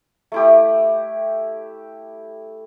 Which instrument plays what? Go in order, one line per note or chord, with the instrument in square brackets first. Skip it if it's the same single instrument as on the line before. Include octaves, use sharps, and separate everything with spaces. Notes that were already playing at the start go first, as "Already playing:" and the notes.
[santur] A3 E4 G4